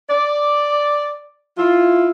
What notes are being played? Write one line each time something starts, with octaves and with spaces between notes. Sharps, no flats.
D5
E4 F4